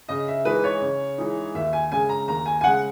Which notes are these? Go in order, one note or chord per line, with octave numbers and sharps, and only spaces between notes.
C#3 D#5
E5
E3 G#3 D#4 B4
C#5
C#3
E3 G#3 D#4
D#2 E5
G#5
C#3 G#3 G#5
A#5
D#2 A#5
G#5
G#5
C#3 G#3 F#5